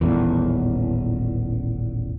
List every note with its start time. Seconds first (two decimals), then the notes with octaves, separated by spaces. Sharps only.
0.01 D#1 A1 E2